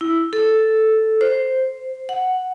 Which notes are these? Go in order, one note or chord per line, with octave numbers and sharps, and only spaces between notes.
E4
A4
C5
F#5